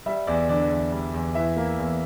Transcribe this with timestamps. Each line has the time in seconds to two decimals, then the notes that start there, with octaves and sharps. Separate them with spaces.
0.06 G3 E5
0.27 E2 D5
0.49 D3 D5
0.70 E2
0.92 G3
1.14 E2
1.35 E3 E5
1.57 A#3
1.79 E2